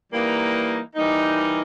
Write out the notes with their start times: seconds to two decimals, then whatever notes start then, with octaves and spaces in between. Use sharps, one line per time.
0.10 E3 G3 A#3 D#4
0.96 E3 G3 A#3 D#4